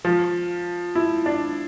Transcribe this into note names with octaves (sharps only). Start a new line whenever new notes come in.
F3
E4
D4